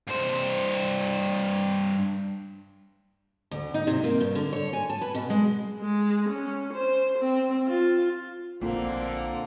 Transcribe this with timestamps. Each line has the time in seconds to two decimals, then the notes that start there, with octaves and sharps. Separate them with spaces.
0.08 G2 C5
3.51 D2
3.74 D#4
3.87 C3
4.04 A#3
4.21 G2
4.35 D3
4.53 C#5
4.73 G#5
4.90 A5
5.01 B4
5.15 B2
5.30 G#3
5.80 G#3
6.29 C#4
6.73 C5
7.19 C4
7.67 F4
8.61 A#1 A#2 D3 A#3 C4